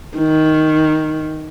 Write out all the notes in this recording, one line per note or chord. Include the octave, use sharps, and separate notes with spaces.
D#3